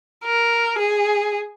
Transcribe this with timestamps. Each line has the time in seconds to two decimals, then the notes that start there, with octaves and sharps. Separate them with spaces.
0.25 A#4
0.79 G#4